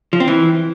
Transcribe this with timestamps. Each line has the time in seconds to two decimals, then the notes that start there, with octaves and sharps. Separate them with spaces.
0.13 F3
0.20 C4
0.28 E3